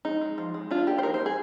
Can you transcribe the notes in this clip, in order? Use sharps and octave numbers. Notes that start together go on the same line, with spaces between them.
G#3 D#4
G#3
F3
G#3
D4 F4
A#3 G4
C5
D#4 A#4
C5
G#3
G#4